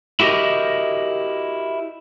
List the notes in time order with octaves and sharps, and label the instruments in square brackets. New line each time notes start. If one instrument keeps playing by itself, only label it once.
[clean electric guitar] E4 F#4 G4 A#4 D#5